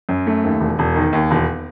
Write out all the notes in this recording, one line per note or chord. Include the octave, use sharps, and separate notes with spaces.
F#2
A3
D#2
E1
E1
D#3
D#2
E1